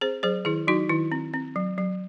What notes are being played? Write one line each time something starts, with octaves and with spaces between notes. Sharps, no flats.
C4 G#4 C5
F#3 G#4 C5
D#3 E4 G#4
F#3 D#4 F#4
D#3 E4
C4
C4
F#3
F#3